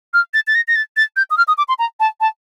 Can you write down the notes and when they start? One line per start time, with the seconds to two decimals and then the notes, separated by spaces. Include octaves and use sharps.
0.14 F6
0.34 A6
0.47 A6
0.55 A#6
0.68 A#6
0.75 A6
0.97 A6
1.16 G6
1.30 D#6
1.37 F6
1.48 D#6
1.58 D6
1.68 C6
1.79 A#5
2.00 A5
2.20 A5